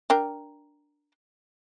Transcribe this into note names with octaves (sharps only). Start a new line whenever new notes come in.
D4 A#4 G5